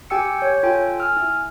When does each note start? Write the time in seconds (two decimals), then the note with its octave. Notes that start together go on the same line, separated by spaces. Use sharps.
0.10 G4 G5 G#5 E6 C#7
0.39 C#5 G6
0.63 F4 A4 G5 G#5
0.99 G#5 E6 F6
1.17 E4